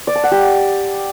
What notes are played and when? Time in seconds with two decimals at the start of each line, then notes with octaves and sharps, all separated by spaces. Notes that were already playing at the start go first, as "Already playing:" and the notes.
0.07 D5
0.15 A5
0.23 F#5
0.32 G4